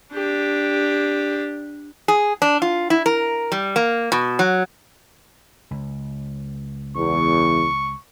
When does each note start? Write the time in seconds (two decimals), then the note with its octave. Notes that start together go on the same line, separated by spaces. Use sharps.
0.14 D4 G4
2.08 G#4
2.42 D4
2.62 F4
2.90 E4
3.06 A#4
3.52 G3
3.76 A#3
4.12 B2
4.39 F#3
5.71 C#2
6.96 E2 C#6